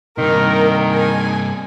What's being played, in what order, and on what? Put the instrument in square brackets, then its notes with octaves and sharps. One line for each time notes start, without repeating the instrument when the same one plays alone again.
[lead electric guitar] G2 C3 [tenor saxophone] D#3 [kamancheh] A#4
[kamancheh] G#5